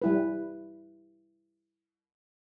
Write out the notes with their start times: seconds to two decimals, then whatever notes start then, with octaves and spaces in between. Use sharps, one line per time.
0.02 G3 E4 B4